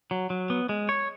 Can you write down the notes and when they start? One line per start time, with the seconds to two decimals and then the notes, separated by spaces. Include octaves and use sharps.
0.11 F#3
0.30 F#3
0.50 B3
0.69 G#3
0.89 C#5